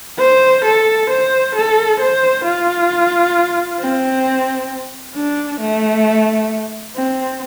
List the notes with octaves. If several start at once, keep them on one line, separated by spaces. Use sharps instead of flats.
C5
A4
C5
A4
C5
F4
C4
D4
A3
C4